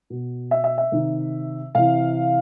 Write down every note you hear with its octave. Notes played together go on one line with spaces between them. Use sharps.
B2
E5
E5
E5
C3 D#3
C3 E3 F5